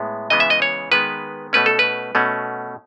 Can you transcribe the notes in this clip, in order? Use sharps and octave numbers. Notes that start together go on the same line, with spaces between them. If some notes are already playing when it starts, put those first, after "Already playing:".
Already playing: A2 G#3 B3
C#3 E3 G#3 B3 D#5
E5
D#5
C#5
D#3 G#3 B3 B4
B2 A3 C#4 B4
A4
B4
B2 A3 C#4